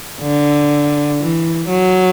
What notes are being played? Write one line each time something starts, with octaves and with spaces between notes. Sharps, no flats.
D3
E3
F#3